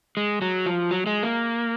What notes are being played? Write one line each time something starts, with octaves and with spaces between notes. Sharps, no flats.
G#3
F#3
F3
F#3
G#3
A#3